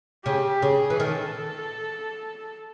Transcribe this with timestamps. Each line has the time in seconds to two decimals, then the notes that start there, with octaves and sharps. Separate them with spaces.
0.25 C#3 G4
0.62 C#3 G#4
0.90 E3
1.00 D#3 A4